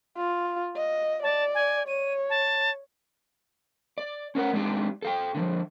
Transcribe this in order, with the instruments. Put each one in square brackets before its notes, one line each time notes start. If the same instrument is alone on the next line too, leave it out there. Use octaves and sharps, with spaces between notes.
[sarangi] F4
D#5
[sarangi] D5 [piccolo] A5
[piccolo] G#5
[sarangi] C#5 [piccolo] D#7
[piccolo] A5
[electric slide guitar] D5
C#4 A#4 B4 F#5
G#3 C4 D4 D#4 G4
A4 F5 G5
D3 E3 F3